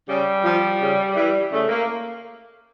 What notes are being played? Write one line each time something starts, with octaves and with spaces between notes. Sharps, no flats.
C#3 G3
F3
C#3
E3 G3
C#3 A3
A#3